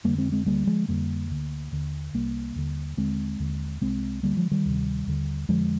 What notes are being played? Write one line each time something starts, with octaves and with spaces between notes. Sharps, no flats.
F2 D3 G3 A#3
G#3 C4
G#3 C4
D2 D3 G3 A#3
F3 G#3
F2 D3 G3 A#3
D2 D3
D#2 D3
C2 C3 G3 A#3
D#2 D3
D#2 D3 G#3 C4
D#2 D3
C2 C3 G#3 C4
D2 D3 G3 A#3
F3 G#3
D#3 G3
D2 C3
D#2 D3
F2 D3 F3 G#3